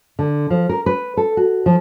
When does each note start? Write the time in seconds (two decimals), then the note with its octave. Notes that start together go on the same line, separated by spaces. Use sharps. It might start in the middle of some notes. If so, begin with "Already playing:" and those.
0.19 D3
0.50 F3
0.69 A#4
0.86 B4
1.17 A4
1.37 F#4
1.66 F3